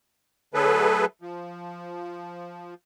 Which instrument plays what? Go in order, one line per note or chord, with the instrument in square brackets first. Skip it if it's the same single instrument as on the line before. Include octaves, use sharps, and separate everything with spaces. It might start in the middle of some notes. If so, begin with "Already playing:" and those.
[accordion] D3 F#3 A3 G#4 A4 B4
F3